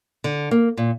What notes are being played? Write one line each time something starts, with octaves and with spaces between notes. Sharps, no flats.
D3
A#3
A#2